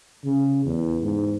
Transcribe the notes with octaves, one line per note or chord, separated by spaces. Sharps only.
C#3
E2
G#2